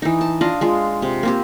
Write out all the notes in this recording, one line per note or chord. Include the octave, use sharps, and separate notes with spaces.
E3 D#4
A5
D4 F4 D#5 F5
G#3 F4
C3
A#3 C4 G4